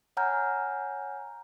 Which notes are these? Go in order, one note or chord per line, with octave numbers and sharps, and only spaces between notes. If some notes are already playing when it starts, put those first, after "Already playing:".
C#5 F#5 G#5 A#5 F6 G6